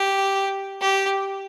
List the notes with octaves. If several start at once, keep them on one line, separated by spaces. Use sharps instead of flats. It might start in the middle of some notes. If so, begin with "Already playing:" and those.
Already playing: G4
G4